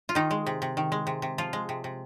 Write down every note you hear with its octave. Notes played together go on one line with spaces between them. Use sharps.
F4
D#3 D#4
G#3
C3
C3
D#3
G#3
C3
C3
F3 F4
G#3
C3
C3